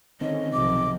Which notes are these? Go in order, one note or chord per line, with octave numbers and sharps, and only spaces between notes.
D3 D#3 C4 C#4 D#5
B1 C3 F3 D6